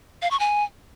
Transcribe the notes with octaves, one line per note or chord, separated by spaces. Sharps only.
F5
C#6
G#5